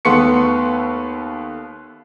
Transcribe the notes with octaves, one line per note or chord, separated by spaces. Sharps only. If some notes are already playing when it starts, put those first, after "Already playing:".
D#2 A3 B3 C6 C#6 C#7